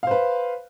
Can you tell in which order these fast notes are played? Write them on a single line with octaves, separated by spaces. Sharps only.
F5 C5 B4